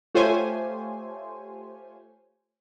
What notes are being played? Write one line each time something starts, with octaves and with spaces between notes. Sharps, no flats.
A3 F4 G4 C5 C#5 G#5